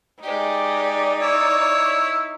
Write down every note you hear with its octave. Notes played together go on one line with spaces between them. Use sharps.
G#3 D#4 G4 D5
E4 C#5